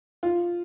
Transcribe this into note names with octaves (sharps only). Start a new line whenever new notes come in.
F4